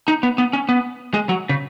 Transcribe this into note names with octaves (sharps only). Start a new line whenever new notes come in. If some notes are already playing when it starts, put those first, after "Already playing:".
D#4
B3
B3
C#4
B3
G#3
F#3
C#3